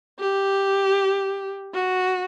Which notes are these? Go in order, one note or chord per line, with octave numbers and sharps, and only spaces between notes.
G4
F#4